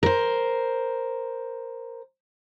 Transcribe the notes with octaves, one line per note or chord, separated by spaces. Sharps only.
A#4 C5